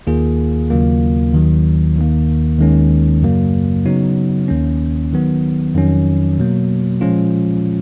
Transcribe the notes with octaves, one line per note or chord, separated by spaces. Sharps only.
D#2 D#3 A#3 F4 G#4
D#2 C#3 F#3 A#3 F4
D#2 D#3 F#3
D#2 D#3 A#3
D#2 D#3 G#3 C#4
F#2 C#3 F#3 A#3
C#3 F#3 B3 D#4 F#4
D#2 D#3 A#3 C#4
D#3 F#3 B3
F2 D#3 F#3 C#4
B2 F#3 A#3
A#2 F3 G#3 C#4 F4